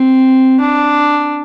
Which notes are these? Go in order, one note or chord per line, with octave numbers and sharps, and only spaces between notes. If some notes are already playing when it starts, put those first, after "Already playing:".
Already playing: C4
D4